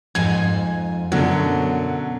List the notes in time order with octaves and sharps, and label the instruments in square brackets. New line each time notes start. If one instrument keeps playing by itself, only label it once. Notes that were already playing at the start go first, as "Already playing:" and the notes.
[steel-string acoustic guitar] F2 G#2 G#5 [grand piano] G#6
[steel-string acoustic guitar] F#2 [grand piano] B2 D3 F#3